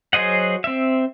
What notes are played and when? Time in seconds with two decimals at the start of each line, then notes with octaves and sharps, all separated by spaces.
0.13 F#3 G#4 C5 D#5 F#5
0.64 C4 E5